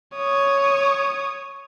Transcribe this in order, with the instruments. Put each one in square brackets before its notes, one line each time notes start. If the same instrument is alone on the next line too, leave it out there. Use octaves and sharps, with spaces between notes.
[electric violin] C#5 D#6